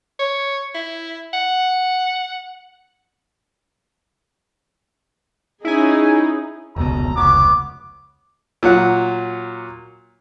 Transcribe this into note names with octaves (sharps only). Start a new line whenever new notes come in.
C#5
E4
F#5
C#4 D#4 E4 G#4 G#5
F1 C#2 B2 A4 A#5
F1 C#2 B3 C#5 D6
A#2 F#3 F#5